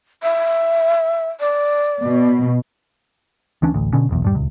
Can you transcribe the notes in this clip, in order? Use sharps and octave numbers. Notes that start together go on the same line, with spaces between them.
E5
D5
B2
D2 E3 C#4 D4
A1 D2
B2 D3 C#4
F1 B1 E2
D#1 G2 G3
D#1 C#2